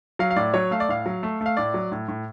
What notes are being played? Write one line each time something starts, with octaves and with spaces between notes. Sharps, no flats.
F#3 F5
F5
A2 D5
F#3 C#5
A3 F5
D5
A2 F5
F#3
A3
A3
F5
A2 D5
F#3
A2
A2